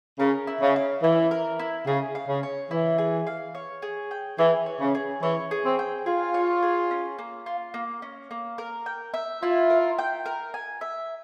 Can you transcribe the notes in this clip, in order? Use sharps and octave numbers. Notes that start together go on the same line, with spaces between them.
C#3 A#4
E4
C#3
F5
E3 E4
A#4
E4
C#3 G#4
F5
C#3
C#5
E3 E4
G#4
F5
C#5
G#4
G5
E3 G#4
C#5
C#3
G#4
E3 C#5
G#4
C4
G5
F4 G#4
C#5
G#4
C#4
A#3
F4
A#3
C#4
A#3
A#4
G5
E5
E4 F4
A#4
G5
A#4
G#5
E5